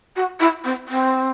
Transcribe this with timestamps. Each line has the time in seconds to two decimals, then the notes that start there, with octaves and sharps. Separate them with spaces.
0.16 F#4
0.40 E4
0.64 C4
0.88 C4